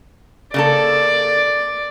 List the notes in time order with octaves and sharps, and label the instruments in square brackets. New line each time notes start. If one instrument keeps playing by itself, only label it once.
[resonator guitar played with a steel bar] C#3 A#3 A4 [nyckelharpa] D5